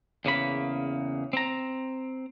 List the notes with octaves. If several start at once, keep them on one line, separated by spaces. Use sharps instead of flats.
E2 C#3 A#3 B5
C4 A#5